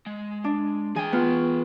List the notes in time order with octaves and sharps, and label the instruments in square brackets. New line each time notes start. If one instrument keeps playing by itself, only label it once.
[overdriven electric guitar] G#3
[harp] D4
[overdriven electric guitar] E3 G5 [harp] G#4 G#5
[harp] B3 F4